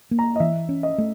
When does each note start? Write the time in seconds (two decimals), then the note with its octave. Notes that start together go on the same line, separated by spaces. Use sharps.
0.11 A#3
0.19 A#5
0.36 D#5
0.40 E3 E5
0.69 C#4
0.83 D#5
0.98 A3